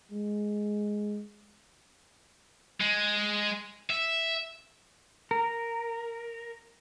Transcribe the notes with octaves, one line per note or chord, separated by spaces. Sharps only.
G#3
G#3
E5
A#4